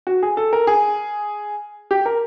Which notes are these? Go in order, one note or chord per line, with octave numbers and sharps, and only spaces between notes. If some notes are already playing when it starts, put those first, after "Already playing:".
F#4
G#4
A4
A#4
G#4
G4
A#4